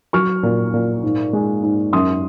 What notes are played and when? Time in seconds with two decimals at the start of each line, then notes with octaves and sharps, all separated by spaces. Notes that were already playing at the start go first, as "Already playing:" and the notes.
0.13 F#3 C#6 F6
0.43 A#2
0.74 A#2
1.03 G#2
1.33 G#3
1.63 G#2
1.93 F#2 C6 D#6